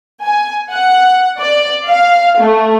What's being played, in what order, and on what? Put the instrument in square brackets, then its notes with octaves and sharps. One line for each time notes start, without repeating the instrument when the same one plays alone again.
[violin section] G#5
F#5
D5
F5
A3